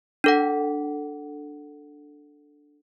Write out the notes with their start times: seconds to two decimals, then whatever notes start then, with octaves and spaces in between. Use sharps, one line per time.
0.24 D4 A4 F#5